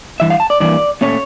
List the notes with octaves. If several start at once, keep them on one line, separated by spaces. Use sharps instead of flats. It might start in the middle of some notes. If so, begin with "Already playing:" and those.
G2 E3 E5
F5
A5
D5
G2 E3 A#3 D5
A#2 A3 C#4 C#5